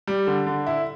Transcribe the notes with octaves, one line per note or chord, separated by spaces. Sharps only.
G3
D3
D3
E4